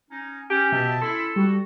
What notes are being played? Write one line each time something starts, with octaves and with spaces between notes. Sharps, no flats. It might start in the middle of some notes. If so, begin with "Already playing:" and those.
C#4 D#4
C#4 G4 G#5
B2 D#5 E5 A5
C#4 E4 A4 C6
G3 F#4